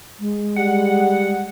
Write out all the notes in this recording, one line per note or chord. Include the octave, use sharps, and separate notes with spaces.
G#3
G3 F#5